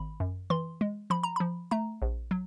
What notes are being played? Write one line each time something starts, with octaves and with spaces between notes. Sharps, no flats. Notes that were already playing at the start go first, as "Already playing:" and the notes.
Already playing: G#1 B5
F#2
E3 C6
G#3
F3 B5
A#5
F3 B5
A3 A#5
A#1
F#3